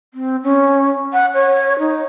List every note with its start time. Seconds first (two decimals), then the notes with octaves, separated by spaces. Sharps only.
0.14 C4
0.44 C#4
1.13 F#5
1.35 C#5
1.79 D#4